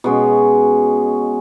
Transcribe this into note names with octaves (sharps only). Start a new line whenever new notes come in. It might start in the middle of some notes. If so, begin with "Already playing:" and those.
B2 G#3 C#4